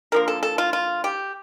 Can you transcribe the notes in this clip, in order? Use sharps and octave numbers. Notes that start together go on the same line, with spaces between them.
D3 F3 A#3 A#4
A4
A4
F4
F4
G4